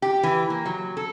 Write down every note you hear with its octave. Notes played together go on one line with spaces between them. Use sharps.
G4
E3
A#3
F#3
A4